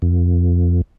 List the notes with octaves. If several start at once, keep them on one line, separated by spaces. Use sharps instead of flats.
F2